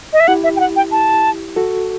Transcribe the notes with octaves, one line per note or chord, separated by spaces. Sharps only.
D#5
E5
E4 G4 F#5
E5
G5
F#5
G5
A5
F#4 A4